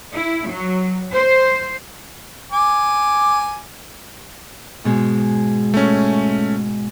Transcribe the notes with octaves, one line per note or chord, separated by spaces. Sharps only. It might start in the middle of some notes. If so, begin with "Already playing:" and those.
E4
F#3
C5
G#5 D6
G#2 B2 G#3
A3 C#4